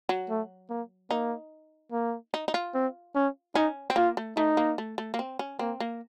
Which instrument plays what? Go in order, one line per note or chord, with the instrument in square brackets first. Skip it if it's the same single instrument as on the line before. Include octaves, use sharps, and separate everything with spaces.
[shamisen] F#3
[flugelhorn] A3
A#3
[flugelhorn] A#3 [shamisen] D#4
[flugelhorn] A#3
[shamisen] D#4
D#4
F4
[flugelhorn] C4
C#4
[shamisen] C#4 [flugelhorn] D#4
[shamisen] C4
[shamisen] A#3 [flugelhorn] F4
[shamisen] A3
[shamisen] A3 [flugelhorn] D#4
[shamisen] A#3
A3
A3
A#3
C4
C#4
[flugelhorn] A#3 [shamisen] C4
[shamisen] A#3